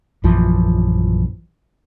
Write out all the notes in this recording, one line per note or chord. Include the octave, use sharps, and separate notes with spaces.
A#1 F#2 E3 F3